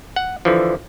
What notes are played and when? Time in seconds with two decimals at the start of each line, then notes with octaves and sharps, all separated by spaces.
0.16 F#5
0.45 D3 E3 F3